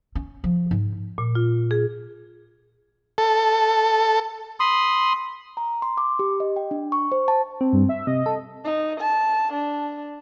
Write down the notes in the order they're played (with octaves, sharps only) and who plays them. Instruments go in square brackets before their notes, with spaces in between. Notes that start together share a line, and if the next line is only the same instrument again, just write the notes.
[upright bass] C#4
F3
G#2
[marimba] A#2
F4
G#4
[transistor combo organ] A4
[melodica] B5 C6 D#6
[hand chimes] A#5
C6
D6
G4
D#5
G5
D4
C#6
C5
A5
[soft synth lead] C4
[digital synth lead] G2
E5
[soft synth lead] C3 [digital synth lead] D#5
[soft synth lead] A4
[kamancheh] D#4
A5
D4